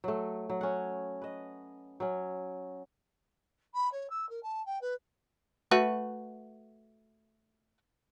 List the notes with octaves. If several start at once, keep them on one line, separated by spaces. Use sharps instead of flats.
F#3 A3
F#3
C#4 F#5
B4 D#5
F#3 C#4
B5
C#5
E6
A#4
A5
G5
B4
A3 F#4 B4